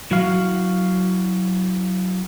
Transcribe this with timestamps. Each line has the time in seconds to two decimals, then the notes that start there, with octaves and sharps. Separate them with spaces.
0.11 F#3 E4 F#4 F5